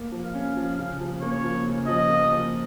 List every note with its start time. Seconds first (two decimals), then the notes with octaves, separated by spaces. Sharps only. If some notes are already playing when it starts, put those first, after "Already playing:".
Already playing: A#3
0.12 F3
0.23 F5
0.35 C#4
0.57 F3
0.79 C#3
1.00 F3
1.22 A#3 C#5
1.44 F3
1.66 C#3
1.87 F3 D#5
2.10 A#3
2.31 F3